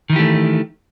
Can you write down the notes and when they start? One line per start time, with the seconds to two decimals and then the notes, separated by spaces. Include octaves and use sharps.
0.10 D#3
0.13 E3
0.16 G4
0.19 A3